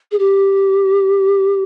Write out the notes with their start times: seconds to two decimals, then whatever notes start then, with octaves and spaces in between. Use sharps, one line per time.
0.11 G#4
0.19 G4